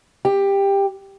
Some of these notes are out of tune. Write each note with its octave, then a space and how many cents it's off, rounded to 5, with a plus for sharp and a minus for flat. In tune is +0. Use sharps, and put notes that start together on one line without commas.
G4 +15